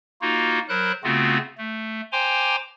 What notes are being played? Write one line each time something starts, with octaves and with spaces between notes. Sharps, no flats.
A#3 D#4 F4 F#4
F#3 A#4 C5 B5 F#6
C#3 A3 B3 C4 F4 F#4
A3
C5 G5 G#5 A#5 C6 D6